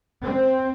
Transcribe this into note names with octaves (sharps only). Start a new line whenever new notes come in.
C4